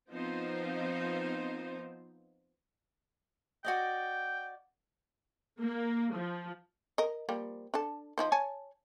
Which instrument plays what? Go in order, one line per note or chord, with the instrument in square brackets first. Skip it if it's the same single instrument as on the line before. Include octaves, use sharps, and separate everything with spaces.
[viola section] F3 B3 C4 D#4 C5
[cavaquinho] F#4 D5 D#5 [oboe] G5
[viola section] A#3
F3
[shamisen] A#4 D#5
F3 G3 A#3
D4 A4 A5
F3 D#4 C5
C#5 G#5 A5